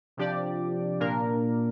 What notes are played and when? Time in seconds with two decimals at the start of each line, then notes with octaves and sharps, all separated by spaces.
0.17 C3 F3 D4 G4 D5
1.00 A#2 A#3 D4 A#4